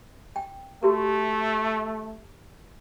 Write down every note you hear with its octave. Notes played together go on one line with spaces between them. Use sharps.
G5
A3 F#4 G4 A#4